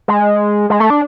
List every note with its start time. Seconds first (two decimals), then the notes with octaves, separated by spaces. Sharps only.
0.08 G#3
0.70 G#3
0.80 A3
0.90 D4